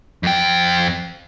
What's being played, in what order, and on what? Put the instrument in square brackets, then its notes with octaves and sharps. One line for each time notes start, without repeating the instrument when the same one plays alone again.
[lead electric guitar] F2 G5